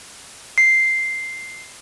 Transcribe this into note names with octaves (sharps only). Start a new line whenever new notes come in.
C7